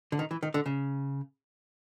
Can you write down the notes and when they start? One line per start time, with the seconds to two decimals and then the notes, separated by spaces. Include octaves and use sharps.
0.12 D3
0.19 D#3
0.31 E3
0.43 D#3
0.54 D3
0.66 C#3